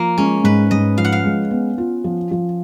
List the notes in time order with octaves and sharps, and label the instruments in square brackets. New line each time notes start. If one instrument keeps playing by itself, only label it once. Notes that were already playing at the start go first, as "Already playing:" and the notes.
Already playing: [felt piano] F3 [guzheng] A#3
[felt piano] G#3 [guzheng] C#4
[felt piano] G#2 [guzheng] B4
[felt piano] G#2 [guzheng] D#5
[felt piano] F3 [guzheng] F5
[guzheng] F#5
F5
[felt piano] G#3
B3
F4
F3
F3